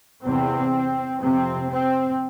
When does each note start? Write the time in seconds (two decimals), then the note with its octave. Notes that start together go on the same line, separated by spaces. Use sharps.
0.25 E2 C3 C4
1.20 F2 C3 C4
1.69 C4